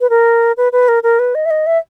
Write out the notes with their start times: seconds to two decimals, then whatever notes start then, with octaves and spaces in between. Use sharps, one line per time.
0.01 B4
0.10 A#4
0.57 B4
0.72 B4
0.88 A#4
1.03 A#4
1.19 B4
1.35 D#5
1.46 E5
1.51 D#5
1.67 E5